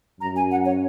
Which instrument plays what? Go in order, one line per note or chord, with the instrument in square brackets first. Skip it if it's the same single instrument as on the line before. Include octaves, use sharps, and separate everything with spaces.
[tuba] F#2 [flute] A#5
[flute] G#5
F#5
C#5